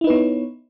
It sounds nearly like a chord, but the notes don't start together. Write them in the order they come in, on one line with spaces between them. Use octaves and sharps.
E4 D#4 B4 B3 C#5